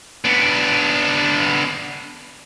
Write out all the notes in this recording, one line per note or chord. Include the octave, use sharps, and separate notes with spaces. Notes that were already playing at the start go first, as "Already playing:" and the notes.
B3 D4